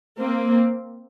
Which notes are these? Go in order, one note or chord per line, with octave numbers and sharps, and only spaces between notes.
A#3 C4